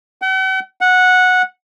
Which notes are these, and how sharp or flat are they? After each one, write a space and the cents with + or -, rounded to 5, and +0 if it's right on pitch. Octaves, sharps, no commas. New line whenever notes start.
F#5 +45
F#5 -10